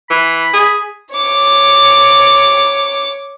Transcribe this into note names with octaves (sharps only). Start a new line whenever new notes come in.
E3 B5
G#4
C#5 D6